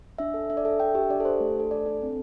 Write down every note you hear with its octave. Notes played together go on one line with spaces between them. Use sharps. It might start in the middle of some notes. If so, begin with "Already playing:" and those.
D4 E5
A4
D4 E5
D5
A4 E5
D4 G5
G4 E5
D4 D5
A4
G4 C5
A3
D4 A4
A3 D5
D4 A4
C4